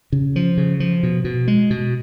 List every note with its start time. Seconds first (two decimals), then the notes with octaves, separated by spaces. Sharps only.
0.12 C#3
0.36 F3
0.57 C#3
0.80 F3
1.03 B2
1.24 B2
1.48 G#3
1.70 B2